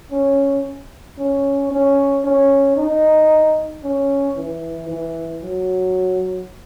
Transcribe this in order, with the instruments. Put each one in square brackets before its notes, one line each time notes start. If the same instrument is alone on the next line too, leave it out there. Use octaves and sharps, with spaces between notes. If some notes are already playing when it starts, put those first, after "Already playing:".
[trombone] C#4
C#4
C#4
C#4
D#4
C#4
E3
E3
F#3